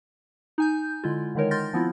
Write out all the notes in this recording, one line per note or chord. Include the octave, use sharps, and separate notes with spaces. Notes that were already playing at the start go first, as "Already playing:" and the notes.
D#4 G#5 G6
D3 G#3 E4 F4
D3 D#3 G#3 D#4 A#4 C#5
C6 F6 G6 A6 A#6
F3 B3 C4 E4 F4